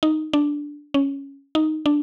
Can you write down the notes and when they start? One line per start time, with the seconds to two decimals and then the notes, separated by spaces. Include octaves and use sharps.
0.03 D#4
0.33 D4
0.94 C#4
1.55 D#4
1.86 D4